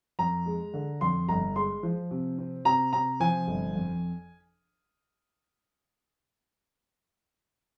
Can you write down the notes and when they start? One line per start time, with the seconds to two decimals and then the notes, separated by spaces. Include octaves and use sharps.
0.19 F2 A#5
0.46 G#3
0.74 D3
1.01 F2 C6
1.28 G1 A#5
1.56 G#3 C6
1.83 F3
2.11 C3
2.38 C4
2.65 C3 A#5
2.93 C3 A#5
3.20 F3 G#5
3.48 G1
3.75 F2